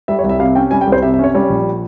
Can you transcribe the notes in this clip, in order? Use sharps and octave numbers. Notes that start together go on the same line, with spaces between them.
G3 E5
C#5
C2
E5
C3 F5
C#4 G5
G3 G#5
G5
C2
C5
C3 E5
E5
C#4 C#5
G3 C#5
A#1